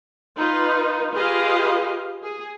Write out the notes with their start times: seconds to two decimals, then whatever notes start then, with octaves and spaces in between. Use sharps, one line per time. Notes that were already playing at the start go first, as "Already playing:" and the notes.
0.38 D#4 F4 B4
1.13 F4 G4 G#4 B4 D#5 F5
2.23 G#4